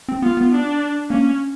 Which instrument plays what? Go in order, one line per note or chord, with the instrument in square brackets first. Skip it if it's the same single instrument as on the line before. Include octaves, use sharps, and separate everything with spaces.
[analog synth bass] C4
[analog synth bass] B3 [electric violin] F4
[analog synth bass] B3
[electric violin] D4
[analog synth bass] A#3 [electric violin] C#4